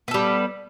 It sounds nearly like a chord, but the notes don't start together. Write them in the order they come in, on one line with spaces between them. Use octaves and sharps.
B3 A4 G3